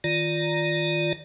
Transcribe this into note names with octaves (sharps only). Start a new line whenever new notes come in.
D#3 F4 D5 A#5